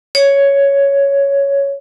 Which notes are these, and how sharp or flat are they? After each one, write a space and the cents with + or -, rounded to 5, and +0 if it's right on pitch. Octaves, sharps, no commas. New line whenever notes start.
C#5 +5